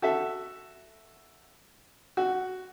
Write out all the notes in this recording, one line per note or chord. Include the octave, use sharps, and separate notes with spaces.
F#4 A4 E5
F#4